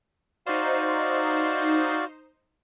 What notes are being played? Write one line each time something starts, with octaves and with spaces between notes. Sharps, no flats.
D#4 F#4 C5 D5 F5